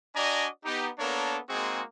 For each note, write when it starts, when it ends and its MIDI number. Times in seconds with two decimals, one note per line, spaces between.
0.15 0.48 62
0.15 0.48 66
0.15 0.48 74
0.15 0.48 75
0.15 0.48 80
0.15 0.48 82
0.65 0.88 59
0.65 0.88 63
0.65 0.88 67
0.99 1.38 58
0.99 1.38 59
0.99 1.38 62
0.99 1.38 69
0.99 1.38 70
0.99 1.38 73
1.49 1.82 56
1.49 1.82 58
1.49 1.82 60
1.49 1.82 63
1.49 1.82 66
1.49 1.82 68